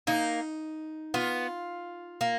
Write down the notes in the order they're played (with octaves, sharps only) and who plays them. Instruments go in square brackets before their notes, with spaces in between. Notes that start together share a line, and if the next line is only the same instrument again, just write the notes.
[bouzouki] A#3 [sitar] D#4
[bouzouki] B3 [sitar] F4
[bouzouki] A#3